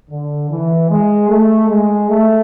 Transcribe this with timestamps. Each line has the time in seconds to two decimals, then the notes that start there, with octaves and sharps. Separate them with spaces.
0.10 D3
0.50 E3
0.89 G#3
1.29 A3
1.69 G#3
2.09 A3